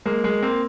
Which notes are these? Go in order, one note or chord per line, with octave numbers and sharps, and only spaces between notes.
G#3 A#3
G#3 A#3
A#3 C4